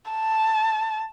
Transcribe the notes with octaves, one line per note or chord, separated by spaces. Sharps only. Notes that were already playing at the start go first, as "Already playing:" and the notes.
A5